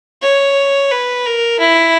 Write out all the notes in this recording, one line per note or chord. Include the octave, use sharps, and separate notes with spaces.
C#5
B4
A#4
E4